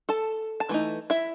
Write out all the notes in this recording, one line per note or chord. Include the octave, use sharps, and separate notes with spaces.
A4 A5
A5
E3 A3 D#4
E4 E5